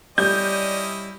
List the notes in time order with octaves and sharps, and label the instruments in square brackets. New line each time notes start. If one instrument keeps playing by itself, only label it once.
[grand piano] G3 [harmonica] C#4 E4 D#5 [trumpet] D5 [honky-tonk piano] G6